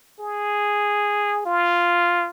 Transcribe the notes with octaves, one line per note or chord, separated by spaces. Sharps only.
G#4
F4